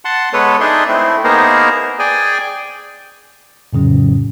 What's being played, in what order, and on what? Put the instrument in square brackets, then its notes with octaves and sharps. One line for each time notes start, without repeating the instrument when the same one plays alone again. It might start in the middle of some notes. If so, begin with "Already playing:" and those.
[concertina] F#5 A5 C6
G#3 B3 A4 B4 C#5
D4 D#4 G#4 D5 E5 C6
A3 C4 E4
A#3 B3 D#4 G#4 A#4 C5
G#4 D5 G5 G#5
[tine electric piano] F2 A2 C#3 F#3 C#4